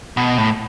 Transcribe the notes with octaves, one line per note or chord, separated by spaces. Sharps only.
B2
A2